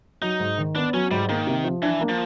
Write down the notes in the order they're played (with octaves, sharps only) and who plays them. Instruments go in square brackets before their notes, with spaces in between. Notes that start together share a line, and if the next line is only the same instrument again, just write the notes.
[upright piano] F#3 [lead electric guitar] D#4
[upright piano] G#2
D#3
[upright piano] B3 [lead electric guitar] D4
[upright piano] F#3 [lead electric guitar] C#4
[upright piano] G#2 [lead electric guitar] G3
[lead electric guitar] D#3 [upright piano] A#3
[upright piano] C3
F3
[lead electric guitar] E3 [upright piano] D4
[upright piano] A#3
[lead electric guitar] F3